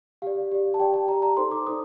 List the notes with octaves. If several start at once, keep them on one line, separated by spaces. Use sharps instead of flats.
G4 D5 F5
G4 D5
A5
G4 D5 G5
A5
G4 D5 A#5
A#5
D#4 A4 C5 C6
D6
D#4 A4 C5 D#6